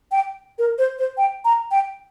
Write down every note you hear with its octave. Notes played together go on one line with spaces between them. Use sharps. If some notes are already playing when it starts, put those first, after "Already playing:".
G5
A#4
C5
C5
G5
A#5
G5